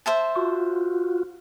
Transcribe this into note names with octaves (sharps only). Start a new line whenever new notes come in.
C5 E5 A5
F4 F#4